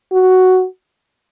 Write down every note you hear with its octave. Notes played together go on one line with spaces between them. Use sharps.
F#4